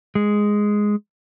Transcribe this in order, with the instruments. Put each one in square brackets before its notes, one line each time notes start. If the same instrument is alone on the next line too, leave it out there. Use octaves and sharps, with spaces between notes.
[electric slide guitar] G#3